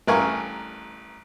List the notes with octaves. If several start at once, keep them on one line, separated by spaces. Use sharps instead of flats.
A1 G2 A#4 F5 G#5 C#6